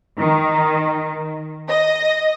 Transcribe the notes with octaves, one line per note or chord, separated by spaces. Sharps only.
D#3
D#5